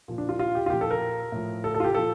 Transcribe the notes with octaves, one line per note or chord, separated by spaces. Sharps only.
A#2 F3
D4
F4
F4
G4
F4
A#2 F3 G4
A4
A#4
A2 F3
A4
A4
F4
G4
A#2 F3 A4